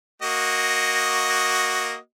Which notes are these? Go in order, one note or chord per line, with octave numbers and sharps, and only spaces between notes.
A#3 F#4 D#5